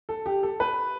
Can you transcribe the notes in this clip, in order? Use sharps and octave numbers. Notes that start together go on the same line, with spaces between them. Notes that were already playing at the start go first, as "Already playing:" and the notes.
A4
G4
A4
B4